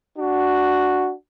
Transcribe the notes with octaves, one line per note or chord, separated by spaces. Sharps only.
D4 F#4